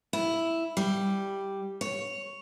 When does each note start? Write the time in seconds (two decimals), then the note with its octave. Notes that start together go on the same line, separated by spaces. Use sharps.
0.13 E4
0.77 G3
1.81 C#5